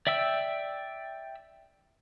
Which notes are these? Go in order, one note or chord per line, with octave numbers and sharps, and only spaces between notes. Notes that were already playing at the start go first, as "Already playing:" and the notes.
D5 E5 G5 E6